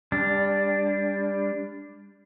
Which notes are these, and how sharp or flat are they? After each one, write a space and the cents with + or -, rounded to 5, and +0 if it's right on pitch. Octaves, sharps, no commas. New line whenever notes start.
G3 +30 D4 +0